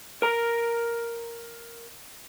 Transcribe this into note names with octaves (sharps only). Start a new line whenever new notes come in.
A#4 A#5